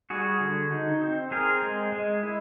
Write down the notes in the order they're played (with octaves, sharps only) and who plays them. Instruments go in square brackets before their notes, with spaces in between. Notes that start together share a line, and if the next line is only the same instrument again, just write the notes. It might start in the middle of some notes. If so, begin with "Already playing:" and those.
[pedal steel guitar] G3 F#4 G#4
D3
D#4
C4
C4 G#4 A#4
G#3
G#3
E4